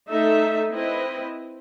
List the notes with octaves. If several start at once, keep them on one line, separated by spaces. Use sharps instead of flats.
A3 D#4 A4 E5
C4 E4 B4 D#5